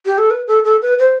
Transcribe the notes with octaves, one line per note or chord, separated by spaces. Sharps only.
G4
A4
B4
A4
A4
B4
C5